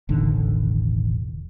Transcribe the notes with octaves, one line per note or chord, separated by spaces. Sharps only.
E1 A1 D3 D#3